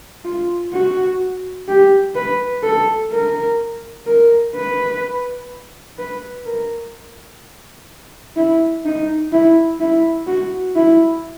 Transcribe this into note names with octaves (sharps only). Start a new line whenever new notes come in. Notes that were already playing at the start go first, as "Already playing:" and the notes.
F4
F#4
G4
B4
A4
A#4
A#4
B4
B4
A#4
E4
D#4
E4
E4
F#4
E4